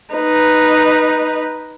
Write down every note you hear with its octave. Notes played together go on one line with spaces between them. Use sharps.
D#4 B4